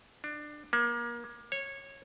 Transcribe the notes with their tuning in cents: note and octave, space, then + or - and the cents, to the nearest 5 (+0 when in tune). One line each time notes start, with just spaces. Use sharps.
D4 +20
A#3 +30
C#5 -15